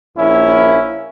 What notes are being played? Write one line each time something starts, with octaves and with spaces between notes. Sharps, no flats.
A#1 A#3 C#4 E4